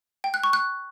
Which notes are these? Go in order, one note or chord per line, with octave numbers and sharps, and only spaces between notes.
G5
F#6
C#6
F#6